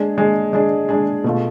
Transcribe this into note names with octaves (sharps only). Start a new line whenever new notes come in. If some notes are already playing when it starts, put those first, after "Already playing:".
Already playing: G#3 D4 G#4
G#3 D4 G#4
G#3 D4 G#4
G#3 D4 G#4
B2 A3 F4